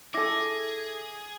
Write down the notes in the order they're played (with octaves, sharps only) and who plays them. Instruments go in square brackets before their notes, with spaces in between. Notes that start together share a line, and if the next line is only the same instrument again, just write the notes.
[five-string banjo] E4 A4 [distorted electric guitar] G#4 [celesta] D6 A#6